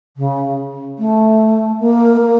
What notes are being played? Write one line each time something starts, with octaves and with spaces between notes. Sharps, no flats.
C#3
A3
A#3
A#3